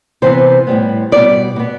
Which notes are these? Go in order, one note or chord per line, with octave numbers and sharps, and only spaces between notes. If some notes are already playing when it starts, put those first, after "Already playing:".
C3 E3 B3 C5
A2 G3 B3
B2 G3 B3 D5
B2 B3